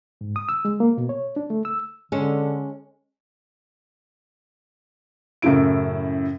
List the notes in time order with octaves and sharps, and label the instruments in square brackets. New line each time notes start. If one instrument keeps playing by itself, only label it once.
[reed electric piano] G#2
D#6
E6
G#3
A#3
B2
C#5
D4
A3
E6
[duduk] D3 [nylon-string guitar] G#3 C#4 A4
[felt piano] F#2 A2 C#3 E4 D7